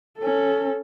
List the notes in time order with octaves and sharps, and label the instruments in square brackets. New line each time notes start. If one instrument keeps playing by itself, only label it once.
[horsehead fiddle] C#4 A4